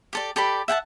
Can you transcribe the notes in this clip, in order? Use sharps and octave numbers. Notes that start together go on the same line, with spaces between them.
G4 A4 D5
G4 A4 D5 B5
E5 F#5 G5 A5